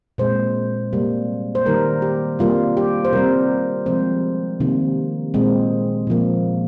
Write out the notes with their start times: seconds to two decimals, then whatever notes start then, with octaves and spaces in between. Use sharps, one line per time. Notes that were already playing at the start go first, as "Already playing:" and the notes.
0.18 A#2 G#3 C4 C5
0.93 C3 G3 A#3
1.55 C5
1.66 D#3 G3 A#3 A#4
2.02 G4
2.39 C3 G3 A#3 F4
2.77 G4
3.05 C5
3.13 C3 G3 C4 A#4
3.86 C3 F3 G#3 C4 C5
4.60 C3 D#3 A#3
5.34 A#2 G#3 C4
6.07 A#2 F3 A#3